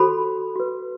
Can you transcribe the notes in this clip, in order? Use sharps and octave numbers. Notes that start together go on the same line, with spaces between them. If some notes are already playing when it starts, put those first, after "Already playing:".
Already playing: F#4 A4 C5 B5
F#4 B4